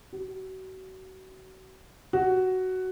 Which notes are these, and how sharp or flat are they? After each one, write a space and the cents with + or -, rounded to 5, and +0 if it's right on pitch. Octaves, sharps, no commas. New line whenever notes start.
F#4 +35
F#4 +10